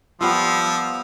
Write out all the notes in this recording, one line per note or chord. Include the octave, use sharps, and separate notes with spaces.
F3 G3 B3 F4 F#5 D#6 E6